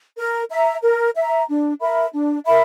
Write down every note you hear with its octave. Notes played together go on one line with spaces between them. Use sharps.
A#4
E5 A#5
A#4
E5 A#5
D4
A#4 E5 B5
D4
A#4 E5 B5